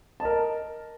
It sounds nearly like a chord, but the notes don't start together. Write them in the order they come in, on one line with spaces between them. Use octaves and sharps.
A5 D#5 A#4